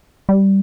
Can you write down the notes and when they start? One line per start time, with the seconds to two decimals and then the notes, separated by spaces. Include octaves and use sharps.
0.29 G3